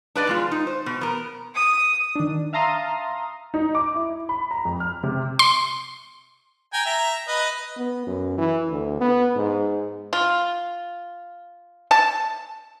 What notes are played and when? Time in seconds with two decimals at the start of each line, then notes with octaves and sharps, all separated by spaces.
0.15 D4 B4 D5 D#5
0.27 B2 G#3 F4
0.51 D#4
0.67 C5
0.86 B2
1.01 B3 A#4
1.55 D#6
2.15 D#3 D4
2.53 E5 F5 A5 A#5 C6 D#6
3.54 D#4
3.75 D6
3.95 E4
4.29 B5
4.51 A#5
4.65 F2
4.80 F6
5.03 C3
5.39 C6
6.74 G5 G#5 A#5
6.86 E5 A#5
7.28 B4 D#5
7.77 B3
8.07 F#2
8.38 E3
8.70 D2
9.01 B3
9.36 G#2
10.13 F4
11.91 A5